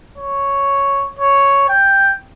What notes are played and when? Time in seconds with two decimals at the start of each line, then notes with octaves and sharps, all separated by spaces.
0.18 C#5
1.19 C#5
1.69 G5